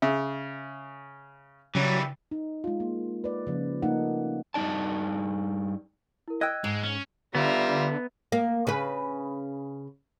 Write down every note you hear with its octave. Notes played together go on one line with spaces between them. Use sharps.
C#3 E5
C#3 E3 F#3 G3
D#4
G#3 F4
A#3
B4 D5
C#3 F3 A#3
A3 A#3 D#4 A4 F#5
G2 F3 D#4 D5 A5
E4 A#4
D#5 G5 E6 F#6 G#6
G#2 G#3
C#4 F6
D3 G3 B3 F4 E5 A#5
A#3
C#3 B4